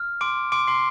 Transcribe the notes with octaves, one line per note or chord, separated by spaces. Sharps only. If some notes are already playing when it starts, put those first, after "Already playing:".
Already playing: F6
C6 D6 D7
C6 D6 D7
C6 C7